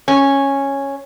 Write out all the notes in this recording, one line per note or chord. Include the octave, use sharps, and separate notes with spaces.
C#4